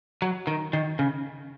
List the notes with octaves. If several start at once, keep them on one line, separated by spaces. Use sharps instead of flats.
F#3
D#3
D#3
C#3